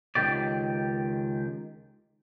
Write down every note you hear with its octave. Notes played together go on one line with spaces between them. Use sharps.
C#2 A2 D#3 G4 D5